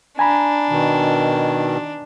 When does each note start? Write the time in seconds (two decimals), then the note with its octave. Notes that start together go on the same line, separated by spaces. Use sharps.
0.19 D4 G#5 A#5 B5
0.70 B2 D#3